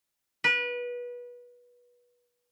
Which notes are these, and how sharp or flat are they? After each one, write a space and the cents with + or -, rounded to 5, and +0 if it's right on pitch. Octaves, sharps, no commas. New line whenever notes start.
B4 -25